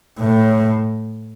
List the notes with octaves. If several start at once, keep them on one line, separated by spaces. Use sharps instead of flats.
A2